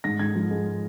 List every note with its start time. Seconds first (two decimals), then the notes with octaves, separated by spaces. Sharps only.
0.04 G#2 A#6
0.19 G#2 G#6
0.35 F3
0.51 G#3